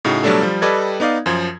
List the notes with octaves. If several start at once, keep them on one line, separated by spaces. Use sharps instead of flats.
A2 C#3 D#4 F#4
B2 F#3 G3 A3 D4 A4
F3 G3
G3 A4 B4 D5 D#5 G#6
B3 D#4 D5 F5
F#2 F3 G#6